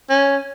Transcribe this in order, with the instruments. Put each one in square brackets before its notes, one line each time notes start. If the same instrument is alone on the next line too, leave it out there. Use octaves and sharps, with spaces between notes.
[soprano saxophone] C#4